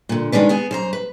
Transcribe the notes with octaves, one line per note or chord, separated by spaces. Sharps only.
A#2 D3
D#3 G#3 C#4 D4 B4
B3 G#4 G#5
F#2 C5 A#5
B4